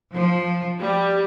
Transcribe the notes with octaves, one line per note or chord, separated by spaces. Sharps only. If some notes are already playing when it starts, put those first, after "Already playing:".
F3
G3